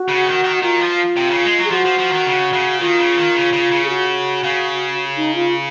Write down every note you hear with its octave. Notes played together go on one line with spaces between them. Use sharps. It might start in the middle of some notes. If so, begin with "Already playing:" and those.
Already playing: F#4
C#3
D#3
D#3
D#3 F4
F3
C3
C#3
G#3
F#3
G#4
F3 F#4
F3
F3
D#3
C#3
C#3
D#3 F4
C#3
D#3
C#3
C#3
C#3
G#4
F#4
C#3
D#4
F4